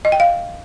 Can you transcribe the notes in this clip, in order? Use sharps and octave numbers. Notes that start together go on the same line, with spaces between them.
D#5
G5
F5